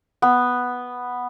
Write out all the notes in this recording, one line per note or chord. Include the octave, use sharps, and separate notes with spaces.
B3